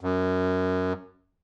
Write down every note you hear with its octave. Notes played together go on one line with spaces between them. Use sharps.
F#2